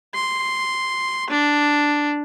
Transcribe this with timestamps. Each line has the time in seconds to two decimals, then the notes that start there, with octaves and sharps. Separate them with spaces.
0.14 C6
1.30 D4